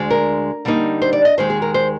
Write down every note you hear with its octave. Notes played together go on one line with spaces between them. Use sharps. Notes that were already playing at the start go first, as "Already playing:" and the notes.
Already playing: D2 D3 G#3
A#4
D3 G3 A#3 D#4
C5
D5
D#5
D#2 D#3 G#3 C5
G#4
A#4
C5